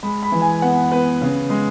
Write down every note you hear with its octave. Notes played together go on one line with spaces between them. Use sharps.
G#3 B5
B5
E3
G#5
B3 F#5
B3 B4
C#3
G#3